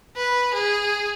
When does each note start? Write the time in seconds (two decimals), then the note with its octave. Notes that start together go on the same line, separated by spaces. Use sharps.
0.16 B4
0.54 G#4